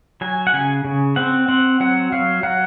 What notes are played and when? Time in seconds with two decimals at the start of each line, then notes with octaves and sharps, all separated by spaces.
0.21 F#3 G#5
0.47 F#5
0.54 C#3 G#5
0.85 C#3
1.16 C4 F#5
1.48 C4 F#5
1.80 F#3 F#5
2.12 F#3 F5
2.43 F#3 F#5